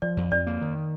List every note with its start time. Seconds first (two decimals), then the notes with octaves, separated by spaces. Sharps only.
0.02 F3 D5
0.17 F2
0.31 F2 D5
0.47 A#3
0.61 D#3